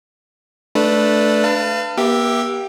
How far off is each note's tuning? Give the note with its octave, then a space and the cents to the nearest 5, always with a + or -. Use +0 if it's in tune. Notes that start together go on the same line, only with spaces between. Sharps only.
A3 -10 D4 +0 B4 +0
B4 +20 F5 -25 A5 +30
A#3 +40 G4 +0 E5 +0